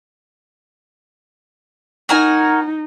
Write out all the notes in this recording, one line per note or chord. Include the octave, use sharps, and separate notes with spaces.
D#4 F#4 A#4 G#5